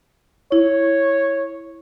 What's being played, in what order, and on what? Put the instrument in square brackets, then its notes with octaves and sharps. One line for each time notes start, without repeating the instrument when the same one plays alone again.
[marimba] E4 [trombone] C#5